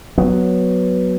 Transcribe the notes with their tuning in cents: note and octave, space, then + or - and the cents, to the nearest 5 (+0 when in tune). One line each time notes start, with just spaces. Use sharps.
F#3 +0 B3 +0